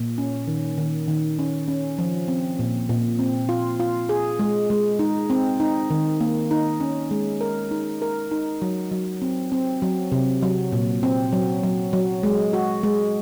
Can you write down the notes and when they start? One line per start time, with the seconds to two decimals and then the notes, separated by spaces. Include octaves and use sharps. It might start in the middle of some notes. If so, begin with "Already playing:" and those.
Already playing: A#2
0.18 C#4
0.47 D#3
0.77 D#3
1.08 D#3
1.39 C#4
1.68 C#4
1.98 F3
2.28 C4
2.59 A#2
2.89 A#2
3.19 C4
3.49 F4
3.80 F4
4.09 G#4
4.39 G#3
4.70 G#3
4.99 D#4
5.30 C4
5.60 D#4
5.90 D#3
6.21 A#3
6.51 D#4
6.80 C#4
7.11 G#3
7.41 A#4
7.71 D#4
8.02 A#4
8.31 D#4
8.62 F#3
8.92 F#3
9.22 C4
9.52 C4
9.82 F#3
10.12 C3
10.43 F#3
10.72 A#2
11.03 C4
11.33 F#3
11.63 F#3
11.93 F#3
12.23 G#3
12.53 F#4
12.83 G#3